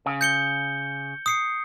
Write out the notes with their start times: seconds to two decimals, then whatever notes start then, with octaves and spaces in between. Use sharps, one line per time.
0.06 C#3
0.21 G6 C#7 G7
1.26 D#6 C7 C#7